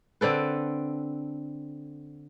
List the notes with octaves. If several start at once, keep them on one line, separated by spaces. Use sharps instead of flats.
D3 C4 A4 B4